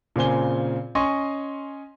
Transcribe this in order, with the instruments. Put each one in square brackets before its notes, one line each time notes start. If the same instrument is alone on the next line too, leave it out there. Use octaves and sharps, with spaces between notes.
[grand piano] A#2 C#3 C4 G#5 G7
C#4 D#5 G#5 C6 C#6